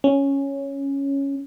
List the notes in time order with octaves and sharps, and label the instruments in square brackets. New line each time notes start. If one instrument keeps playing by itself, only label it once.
[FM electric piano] C#4